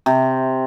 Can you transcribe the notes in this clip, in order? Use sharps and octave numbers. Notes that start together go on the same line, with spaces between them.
C3